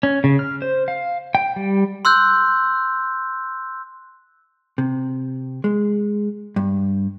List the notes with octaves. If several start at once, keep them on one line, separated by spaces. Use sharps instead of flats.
C#4
C#3
F6
C5
F5
G5
G3
C6 E6 F#6 G6
C3
G#3
G2